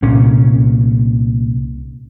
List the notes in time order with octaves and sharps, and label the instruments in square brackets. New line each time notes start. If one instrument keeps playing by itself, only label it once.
[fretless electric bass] C2 A#2 C#4